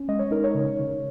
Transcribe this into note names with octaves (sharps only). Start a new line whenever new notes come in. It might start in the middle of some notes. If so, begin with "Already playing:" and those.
Already playing: C#4
G#3 D#5
C#5
D#4 A#4
C#5
C#3
C#3